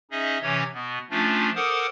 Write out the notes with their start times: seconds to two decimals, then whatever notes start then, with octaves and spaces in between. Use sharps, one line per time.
0.11 C#4 D#4 G#4 D#5 E5
0.42 C3 E3 C#4 C#5
0.74 B2 B3
1.10 F3 A3 C#4 D4 F4
1.55 A4 A#4 C5 F#5 D6 D#6